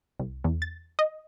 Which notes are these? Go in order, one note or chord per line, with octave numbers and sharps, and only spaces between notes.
C2
E2
A6
D#5